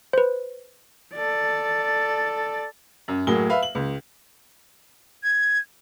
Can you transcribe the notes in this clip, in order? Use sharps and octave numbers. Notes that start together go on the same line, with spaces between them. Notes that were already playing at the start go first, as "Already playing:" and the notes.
B4 C5
A4 D5
F#2
A2 F#3 A#3 G#4 G7
B4 E5 F5
F#7
C#2
G#6